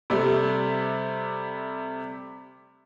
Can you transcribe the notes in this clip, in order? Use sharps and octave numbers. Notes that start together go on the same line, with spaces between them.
C3 G3 A3